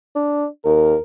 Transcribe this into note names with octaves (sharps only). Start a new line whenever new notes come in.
D4
D#2 A#4